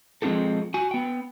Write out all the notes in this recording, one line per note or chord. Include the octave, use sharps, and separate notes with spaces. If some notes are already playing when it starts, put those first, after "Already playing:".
F3 G#3 C4 F4 G4 A4
F#4 G#5
B3 G5